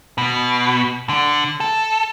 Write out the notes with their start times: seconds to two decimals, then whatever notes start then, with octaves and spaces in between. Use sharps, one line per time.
0.18 B2
1.09 D3
1.60 A4